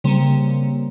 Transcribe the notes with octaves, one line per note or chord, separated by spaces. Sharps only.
C#3 G3 A#3 C4